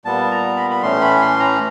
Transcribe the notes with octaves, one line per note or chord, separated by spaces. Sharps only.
A#2 G3 B3 A5
A#5
B5
B5
A2 E3 A3 C#4 C6
B5
C6
A#5